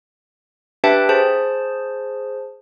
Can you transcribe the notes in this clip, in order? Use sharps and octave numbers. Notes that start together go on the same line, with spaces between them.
D4 G4 B4 E5 G5 A5
G#4 C5 A5